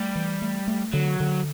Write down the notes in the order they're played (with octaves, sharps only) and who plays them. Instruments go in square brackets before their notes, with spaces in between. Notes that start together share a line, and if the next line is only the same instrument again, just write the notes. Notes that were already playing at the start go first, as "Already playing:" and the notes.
Already playing: [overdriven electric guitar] G3 [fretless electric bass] A3
[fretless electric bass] E3
A3
A3
[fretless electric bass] D3 [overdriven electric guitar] F#3
[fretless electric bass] D3